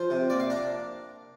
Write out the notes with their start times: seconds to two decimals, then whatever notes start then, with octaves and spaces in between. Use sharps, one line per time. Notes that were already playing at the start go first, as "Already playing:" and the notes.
Already playing: F3 C5
0.10 C3
0.30 A#3 D5
0.40 F5
0.50 D4 A#5